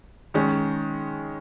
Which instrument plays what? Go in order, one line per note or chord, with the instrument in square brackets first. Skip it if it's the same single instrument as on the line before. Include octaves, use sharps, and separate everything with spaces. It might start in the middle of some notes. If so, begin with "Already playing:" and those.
[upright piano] D#3 G#3 C#4